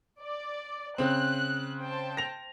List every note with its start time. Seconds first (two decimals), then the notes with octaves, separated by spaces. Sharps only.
0.21 D5
0.98 C#3 C4 F#6
1.80 C5 G5 A5
2.17 A#6 F7